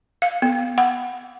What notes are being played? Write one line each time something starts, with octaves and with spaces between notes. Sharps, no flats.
F5
B3
F#5